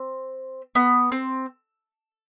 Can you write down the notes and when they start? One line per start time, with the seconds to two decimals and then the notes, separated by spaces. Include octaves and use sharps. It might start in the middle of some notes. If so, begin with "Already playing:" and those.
Already playing: C4
0.75 B3
1.12 C4